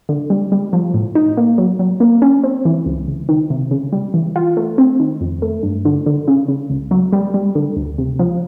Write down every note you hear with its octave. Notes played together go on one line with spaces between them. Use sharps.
D3
G3
G3
F3
A2
D#4
A#3
F#3
F#3
A#3
C#4
C4
E3
C#2
C#2
D#3
C3
C#3
G3
E3
F4
A3
C4
D#3
F2
A3
G2
D3
D3
C#3
C#3
C#2
F#3
G3
G3
D3
D2
C3
F3